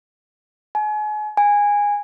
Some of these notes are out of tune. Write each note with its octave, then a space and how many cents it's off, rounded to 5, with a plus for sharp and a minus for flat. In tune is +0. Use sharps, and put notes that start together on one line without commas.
G#5 +35
G#5 -15